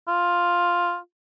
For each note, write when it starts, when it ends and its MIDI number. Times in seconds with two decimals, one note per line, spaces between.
0.08 0.97 65